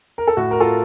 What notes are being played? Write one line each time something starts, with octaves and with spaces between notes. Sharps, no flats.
A#4
A4
A2 F#4
A#4
F4 A4